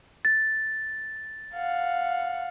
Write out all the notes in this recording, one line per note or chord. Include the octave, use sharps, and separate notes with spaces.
A6
F5 F#5